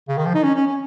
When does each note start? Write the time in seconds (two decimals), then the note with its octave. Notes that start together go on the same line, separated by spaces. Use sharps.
0.08 C#3
0.18 D#3
0.26 F3
0.34 D#4
0.44 C#4
0.55 C#4
0.66 C#4